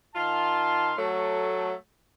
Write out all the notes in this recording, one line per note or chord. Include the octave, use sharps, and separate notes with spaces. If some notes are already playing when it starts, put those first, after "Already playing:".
D#3 F4 F5 A5 C6
F#3 A3